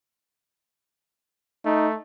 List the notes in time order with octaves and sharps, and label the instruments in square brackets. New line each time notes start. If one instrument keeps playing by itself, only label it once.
[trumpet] A3 [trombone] D#4